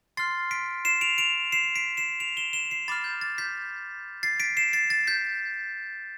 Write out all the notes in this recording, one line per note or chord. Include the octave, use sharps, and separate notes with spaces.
C6 F6 A6 C7
B6 D7
C7 E7
D7 F7
D7 F7
C7 E7
B6 D7
C7 E7
D7 F7
E7 G7
E7 G7
C7 E7
B5 D6 F6 A6
G6
A6
G6 B6
A6 C7
B6 D7
C7 E7
A6 C7
A6
G6 B6